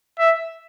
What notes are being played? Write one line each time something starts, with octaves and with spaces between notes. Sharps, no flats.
E5